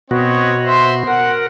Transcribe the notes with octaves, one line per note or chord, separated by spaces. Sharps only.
B2 B3 C4 F#4 C#5 D#5
C5 E5 C6
A#4 F#5